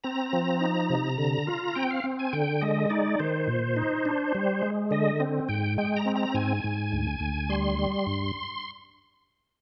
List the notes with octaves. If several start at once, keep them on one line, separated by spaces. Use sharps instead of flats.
C4 A#5
F3
D#4
C3
D3
F4
C4 G5
F5
C4
G#5
D3 G5
G#3 D#5
D#4 D5
D#3 C5
A#2
D#4
D4
G3
G#3
D3 D#5
C4
G#2 G5
G#3 G5
A#5
C4
A#5
G#2 G#5
G#2
D2
D2
G3 C6
G3
G2